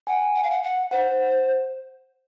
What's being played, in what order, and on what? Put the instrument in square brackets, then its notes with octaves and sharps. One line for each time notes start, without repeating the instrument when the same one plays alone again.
[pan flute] F#5 [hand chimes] G#5
[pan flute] F#5
F5
F#5
F#5
[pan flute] C5 [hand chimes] F#5